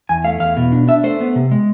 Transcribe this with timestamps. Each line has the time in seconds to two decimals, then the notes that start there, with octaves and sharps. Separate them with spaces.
0.09 E2 G#5
0.24 A3 F5
0.40 E2 F5
0.57 B2
0.72 D4
0.88 D4 E5
1.03 A3 C5
1.20 B3
1.36 C3
1.51 G#3